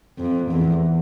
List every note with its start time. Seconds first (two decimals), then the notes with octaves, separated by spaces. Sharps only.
0.18 F2
0.50 E2